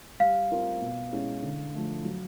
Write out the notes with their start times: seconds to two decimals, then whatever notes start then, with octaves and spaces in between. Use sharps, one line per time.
0.19 G3 F5
0.51 C4 F4 A#4
0.81 B2
1.12 G#3 C#4 E4
1.43 D3
1.75 F3 A3
2.05 F#3